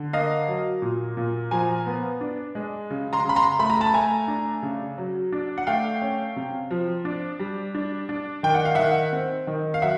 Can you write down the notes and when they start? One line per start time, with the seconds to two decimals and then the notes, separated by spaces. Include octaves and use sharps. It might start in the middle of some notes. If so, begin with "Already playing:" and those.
Already playing: D3
0.13 A#3 D#5 F5
0.48 F#3
0.82 A#2
1.17 A#2
1.51 F3 G#5 A#5
1.86 B3
2.21 D4
2.55 G#3
2.90 C#3
3.13 A#5 C6
3.25 C#3 B5
3.36 A#5 C6
3.59 A3 B5
3.70 A#5
3.80 A5 B5
3.94 A3 G#5 A#5
4.28 D4
4.63 C#3
4.98 F#3
5.32 D4
5.58 F#5
5.67 A3 F5 G5
6.02 C#4
6.36 C3
6.71 F3
7.05 D4
7.40 G3
7.75 D4
8.09 D4
8.43 D#3 G5
8.55 F#5
8.65 F5
8.75 D#3 E5 F#5
9.13 C4
9.47 D#3
9.74 F5
9.82 F#3 E5 F#5